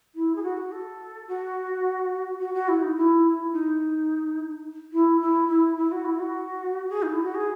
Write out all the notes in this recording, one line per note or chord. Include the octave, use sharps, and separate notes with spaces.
E4
G#4
F#4
A4
F#4
F#4
F#4
E4
D#4
E4
D#4
E4
E4
E4
E4
F#4
E4
F#4
G#4
D#4
E4
F#4
G#4